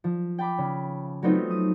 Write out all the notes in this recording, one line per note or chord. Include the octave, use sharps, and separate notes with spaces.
F3
G5 A5 B5 D6
C#3
F#3 A3 B3 C4 D#4 F4
D#6